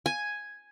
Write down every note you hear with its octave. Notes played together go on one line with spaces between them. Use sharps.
G#5